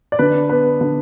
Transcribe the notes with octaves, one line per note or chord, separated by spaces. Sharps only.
D5
D3 B4
B3 B4
D3